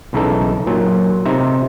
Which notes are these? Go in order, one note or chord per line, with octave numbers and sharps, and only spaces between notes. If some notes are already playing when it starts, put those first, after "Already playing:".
B1 C#3 E3 D#4 A4
A#2 F#3
C3 D#4 E5